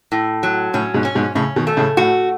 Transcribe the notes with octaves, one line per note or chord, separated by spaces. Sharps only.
A2
F#3
A2 C#4
G#2 B2
C#4
G#2 B2
A2 C#3 C#4
B2 D#3
A3
A2 C#3
A2 F#4